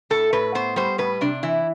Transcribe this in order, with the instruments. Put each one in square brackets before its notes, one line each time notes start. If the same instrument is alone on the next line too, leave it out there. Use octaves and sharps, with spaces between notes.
[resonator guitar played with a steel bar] A2 A4
A2 B4
B3 C5
G3 C5
A2 B4
C3 D4
E3 E4